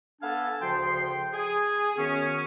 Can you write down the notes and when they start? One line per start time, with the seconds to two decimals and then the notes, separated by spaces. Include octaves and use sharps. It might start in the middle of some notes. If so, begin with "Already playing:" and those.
0.21 B3 D4 A4 F5 G#5 A5
0.61 D2 C#3 F3 G5 C6
1.32 G#4
1.97 F#2 D#3 B3 C#4